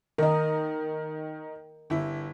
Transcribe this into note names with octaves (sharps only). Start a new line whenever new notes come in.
D#3 A#4 D#5
G1 E4